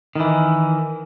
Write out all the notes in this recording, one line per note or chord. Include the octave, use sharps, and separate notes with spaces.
D#3 E3